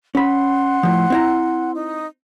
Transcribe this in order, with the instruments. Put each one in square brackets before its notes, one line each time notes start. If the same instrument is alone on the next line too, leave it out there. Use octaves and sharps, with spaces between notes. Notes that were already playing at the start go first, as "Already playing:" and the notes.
[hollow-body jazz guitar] C#4 B5 [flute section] F#5 C6
[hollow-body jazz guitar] A2 F3
C4 E4 A#5
[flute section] D#4